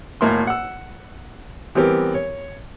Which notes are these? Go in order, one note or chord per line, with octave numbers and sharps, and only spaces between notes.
G#1 A2 A#3 E4 C6
F#5 E6
E3 G3 B3 C4 G4 A#4
C#5